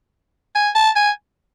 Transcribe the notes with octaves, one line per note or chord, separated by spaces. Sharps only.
G#5
A5
G#5